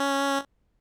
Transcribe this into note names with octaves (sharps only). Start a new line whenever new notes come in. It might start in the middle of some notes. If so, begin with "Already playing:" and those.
Already playing: C#4